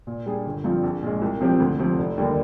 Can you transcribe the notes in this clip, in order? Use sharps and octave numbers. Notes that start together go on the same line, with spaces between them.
A#2
G3 D4 G#4
G1
G2 F3 C4 F4
A#1
A#2 G#3
C2
C3 F3 C4 G4
D2
C3 F3 C4
F1
D#2 D3 G3 A#3